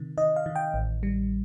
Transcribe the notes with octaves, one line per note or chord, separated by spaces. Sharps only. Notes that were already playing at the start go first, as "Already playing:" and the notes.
Already playing: C3 D#3
D#3 D#5
F5
D#3
G5
A1
G3